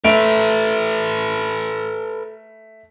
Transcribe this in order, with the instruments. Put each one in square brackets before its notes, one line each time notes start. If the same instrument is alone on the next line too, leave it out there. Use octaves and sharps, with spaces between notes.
[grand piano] A3 D7 F7 [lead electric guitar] A4 B4